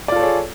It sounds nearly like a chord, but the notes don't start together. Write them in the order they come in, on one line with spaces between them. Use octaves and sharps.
D5 F4 A4 C#5 G#4